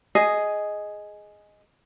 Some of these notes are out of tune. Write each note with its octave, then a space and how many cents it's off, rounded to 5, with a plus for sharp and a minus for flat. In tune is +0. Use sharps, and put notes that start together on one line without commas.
G#4 +5 D#5 +0